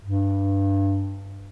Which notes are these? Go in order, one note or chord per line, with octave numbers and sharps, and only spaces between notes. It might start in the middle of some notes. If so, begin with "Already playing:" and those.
G2